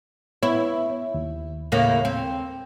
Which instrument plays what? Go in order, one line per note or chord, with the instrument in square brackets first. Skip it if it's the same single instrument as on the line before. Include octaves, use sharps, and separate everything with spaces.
[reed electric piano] B3 C#5 [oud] E4
[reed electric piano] D#2
[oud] A2 C#3 A#3
C4